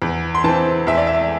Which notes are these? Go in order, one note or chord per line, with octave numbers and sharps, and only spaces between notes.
E2
C6
E3 C4 A5
E2 E5
D5
E5